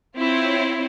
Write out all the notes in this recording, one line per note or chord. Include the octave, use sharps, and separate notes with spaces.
C4 E4 F4 C#5